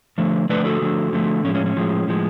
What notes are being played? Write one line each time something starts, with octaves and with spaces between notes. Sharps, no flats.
D3 F3 A3
D3 F3 A3 B4 D5
F#4 A4
D3 F3 A3
D3 F3 A3
A2 F3 G#3 C#4
C#4
C#4
A2 F3 G#3
A2 F3 G#3